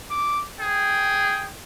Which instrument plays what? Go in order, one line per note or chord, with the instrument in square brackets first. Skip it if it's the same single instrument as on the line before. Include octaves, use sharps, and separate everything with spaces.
[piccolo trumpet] D6
[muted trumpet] G#4 [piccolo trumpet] G5